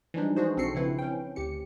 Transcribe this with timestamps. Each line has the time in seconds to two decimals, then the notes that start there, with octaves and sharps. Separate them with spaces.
0.14 E3 F3 G3 G#3 D4 D#4
0.36 D4 D#4 F#4 G#4 C5
0.57 B1 C4 F#4 A4 C7 C#7
0.74 C#3 F3 C4 E4 B4
0.99 C#4 G5
1.36 D2 G4 C#7